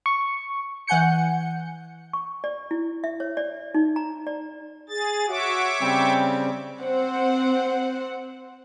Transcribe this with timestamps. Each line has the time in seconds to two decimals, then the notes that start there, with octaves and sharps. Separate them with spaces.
0.06 C#6
0.87 E3 F#5 G#5 G6 C#7
2.13 C#6
2.44 D5
2.71 E4
3.04 E5
3.20 C#5
3.37 D5
3.74 D#4
3.96 A#5
4.27 D5
4.89 G#4 A6
5.29 F#4 C#5 E5 D6
5.81 C#3 G3 C4 G5
6.82 C4 C5 F#5